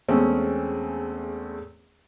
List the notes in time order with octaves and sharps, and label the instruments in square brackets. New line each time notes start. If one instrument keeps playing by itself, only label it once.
[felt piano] E2 G#3 A3 C4 C#4